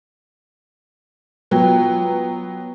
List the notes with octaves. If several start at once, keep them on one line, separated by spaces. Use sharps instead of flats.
F#3 B3 F4 G5